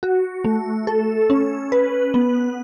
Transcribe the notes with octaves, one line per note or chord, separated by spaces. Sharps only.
F#4
A3
A4
C#4
B4
B3